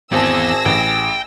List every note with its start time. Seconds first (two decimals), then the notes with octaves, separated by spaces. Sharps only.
0.12 G#1 B3 C4 E4 G#4 A5 E6 A#6
0.65 A1 G5